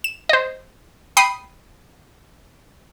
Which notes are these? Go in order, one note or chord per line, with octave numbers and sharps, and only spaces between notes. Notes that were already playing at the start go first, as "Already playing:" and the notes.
E7
C5 D#5
G5 B5 D#6 C7 D#7